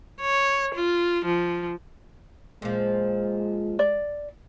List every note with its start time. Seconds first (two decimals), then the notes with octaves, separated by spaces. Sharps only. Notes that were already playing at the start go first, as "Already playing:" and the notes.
0.21 C#5
0.74 F4
1.25 F3
2.62 A#2 F3 G#3
3.79 D5